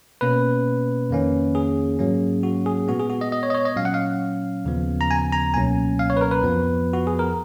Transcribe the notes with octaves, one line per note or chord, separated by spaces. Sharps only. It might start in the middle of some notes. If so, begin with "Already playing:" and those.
B2 A#3 C#4 B4
F2 D#3 A#3 C#4
G#4
G#2 F#3 A#3 C#4
F#4
G#4
A#2 G#3 B3 F#4
G#4
F#4
D#5
D#5
C#5
D#5
C#5
D#5
A#2 F#3 C#4 F5
F#5
F5
D#2 C#3 F3 B3
A#5
G#5
A#5
C#2 B2 F#3 A#3 C#4 G#5
F5
C#5
B4
A#4
B4
F2 F3 B3
F#4
G#4
A#4